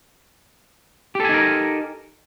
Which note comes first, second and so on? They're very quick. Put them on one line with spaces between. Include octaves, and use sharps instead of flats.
G4 A4 G#5 D#4 A#4